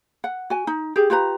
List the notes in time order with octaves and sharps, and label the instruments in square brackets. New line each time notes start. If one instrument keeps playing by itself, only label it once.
[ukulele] F#5
F#4 G#5
D#4
G4 G#4
F4 G4 B4 A#5